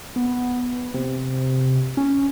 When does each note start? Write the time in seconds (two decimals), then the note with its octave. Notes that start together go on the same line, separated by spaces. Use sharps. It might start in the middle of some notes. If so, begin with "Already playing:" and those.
0.16 B3
0.94 C3
1.97 C#4